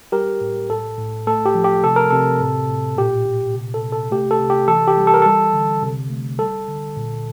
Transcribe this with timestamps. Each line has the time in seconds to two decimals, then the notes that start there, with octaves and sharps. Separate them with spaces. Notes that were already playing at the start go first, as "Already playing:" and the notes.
0.12 G3 G4 A#4
0.41 A2
0.70 A2 A4
0.98 A2
1.27 A3 A4
1.46 G4
1.55 F3
1.64 G4
1.84 C3 A4
1.96 A#4
2.11 C3 A4
2.40 A2
2.69 A2
2.97 A#2 G4
3.26 A#2
3.54 C3
3.74 A4
3.83 C3
3.92 A4
4.11 A3 G4
4.31 A4
4.40 C3
4.50 G4
4.68 E3 A4
4.87 G4
4.97 G3
5.07 A4
5.14 A#4
5.22 G3 A4
5.53 D3
5.82 C3
6.10 A3
6.39 G3 A4
6.68 D3
6.97 A#2